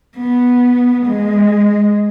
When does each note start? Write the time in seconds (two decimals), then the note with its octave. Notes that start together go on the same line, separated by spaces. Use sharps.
0.18 B3
1.06 G#3